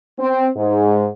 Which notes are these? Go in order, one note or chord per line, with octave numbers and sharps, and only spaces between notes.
C4
G#2